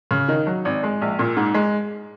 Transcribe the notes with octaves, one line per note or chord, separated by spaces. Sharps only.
C#3
D#3 D#4
F#3
G#1
G#3
A#1
A#2
G#2
G#3